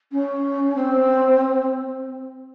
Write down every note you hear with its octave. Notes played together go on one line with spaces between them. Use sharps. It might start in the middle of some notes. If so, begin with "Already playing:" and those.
C#4
C4